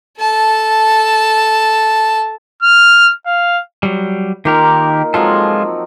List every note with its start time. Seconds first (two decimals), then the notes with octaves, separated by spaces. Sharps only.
0.19 A4 A5
2.63 F6
3.26 F5
3.83 F#3 G3
4.45 D#3 A#3 D#4 F4 G4 A#4
5.14 F3 F#3 G#3 C4 F4 A4